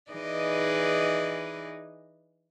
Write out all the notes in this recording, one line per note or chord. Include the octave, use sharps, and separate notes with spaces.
E3 D#4 G#4 B4 D5 D#5